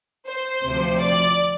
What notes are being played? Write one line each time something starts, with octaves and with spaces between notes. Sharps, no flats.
C5
D2 C3 F3
D5